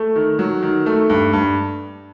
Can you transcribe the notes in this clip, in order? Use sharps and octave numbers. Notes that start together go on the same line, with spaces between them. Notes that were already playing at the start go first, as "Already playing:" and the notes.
Already playing: A3
D#3
F#3
D#3
A3
G2
G2